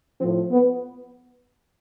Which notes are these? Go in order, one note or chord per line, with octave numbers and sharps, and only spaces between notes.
A2 F3 C4
B3